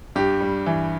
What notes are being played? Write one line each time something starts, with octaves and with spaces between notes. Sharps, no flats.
G2 G4
G3
E3